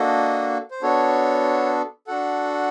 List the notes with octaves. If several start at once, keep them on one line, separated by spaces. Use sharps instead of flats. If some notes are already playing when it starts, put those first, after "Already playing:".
Already playing: A#3 D4 F#4 A4 D#5
C5
B3 D4 F#4 A4 C#5
D4 F#4 A4 F#5